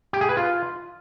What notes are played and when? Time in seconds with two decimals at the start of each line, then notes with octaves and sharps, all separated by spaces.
0.13 G4
0.21 G#4
0.29 B4
0.37 F4